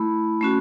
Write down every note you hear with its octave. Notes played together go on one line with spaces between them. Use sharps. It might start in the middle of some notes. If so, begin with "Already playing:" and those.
Already playing: A3 E4 B5
A3 C#4 F#4